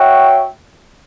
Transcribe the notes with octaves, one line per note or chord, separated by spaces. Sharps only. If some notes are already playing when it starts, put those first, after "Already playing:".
Already playing: F#4 C#5 E5 G5